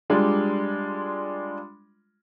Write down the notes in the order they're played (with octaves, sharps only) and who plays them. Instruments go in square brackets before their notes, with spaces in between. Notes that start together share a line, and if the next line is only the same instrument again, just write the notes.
[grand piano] G3 G#3 D4 F4